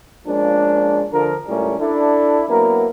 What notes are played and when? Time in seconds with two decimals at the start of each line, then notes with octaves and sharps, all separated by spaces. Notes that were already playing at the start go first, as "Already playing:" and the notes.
0.27 F3 G#3 A#3 C#4 D4
1.13 D3 F3 A#4
1.48 C#2 A2 G3 A3 C#4 A#4
1.79 D4 E4 A4
2.48 F#3 A#3 B3 E4 A#4